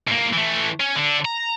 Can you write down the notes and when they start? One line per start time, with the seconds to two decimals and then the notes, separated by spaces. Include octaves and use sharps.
0.08 G#2 A#3
0.33 E3 A3
0.80 C#4
0.96 D3 D4
1.25 A#5